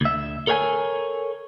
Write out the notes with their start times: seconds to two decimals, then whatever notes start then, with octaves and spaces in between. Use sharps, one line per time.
0.01 D2 E5
0.47 A4 A#4 C#5 F#5 G#5